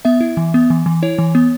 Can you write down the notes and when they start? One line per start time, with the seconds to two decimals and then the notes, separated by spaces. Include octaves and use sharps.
0.05 B3 E5
0.21 E4
0.37 E3
0.54 B3
0.70 E3
0.86 E3
1.03 E4 C#5
1.18 E3
1.35 B3